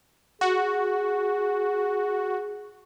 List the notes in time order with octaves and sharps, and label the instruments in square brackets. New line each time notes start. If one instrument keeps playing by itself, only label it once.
[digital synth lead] F#4 [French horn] G#4